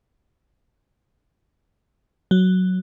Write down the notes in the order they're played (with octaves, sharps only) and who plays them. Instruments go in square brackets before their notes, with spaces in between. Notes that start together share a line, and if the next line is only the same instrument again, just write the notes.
[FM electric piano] F#3